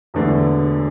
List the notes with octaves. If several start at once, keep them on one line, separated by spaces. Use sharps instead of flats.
E1 E2 D3 A3